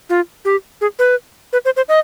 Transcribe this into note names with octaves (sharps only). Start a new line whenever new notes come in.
F4
G4
G#4
B4
B4
C5
C5
D#5